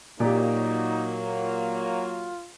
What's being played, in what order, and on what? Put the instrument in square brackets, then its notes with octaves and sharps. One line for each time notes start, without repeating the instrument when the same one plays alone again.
[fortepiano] A#2 G4 [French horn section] F#3 A#3 [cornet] D#4
[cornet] F4